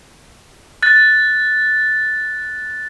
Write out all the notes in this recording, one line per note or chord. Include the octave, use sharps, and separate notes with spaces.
F#6 A6